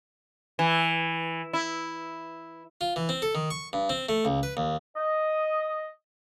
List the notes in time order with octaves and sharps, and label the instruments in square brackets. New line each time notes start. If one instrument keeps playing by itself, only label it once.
[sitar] E3
E4
[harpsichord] F4
E3
C4
A4
D#3
C#6
G2
C4
A3
C#2
B4
D#2
[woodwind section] D#5